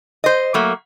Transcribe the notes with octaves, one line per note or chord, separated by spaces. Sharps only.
C5 D#5
F#3 A3 A#3